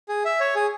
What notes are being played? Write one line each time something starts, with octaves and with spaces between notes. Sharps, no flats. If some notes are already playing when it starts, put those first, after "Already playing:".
G#4
E5
C#5
G#4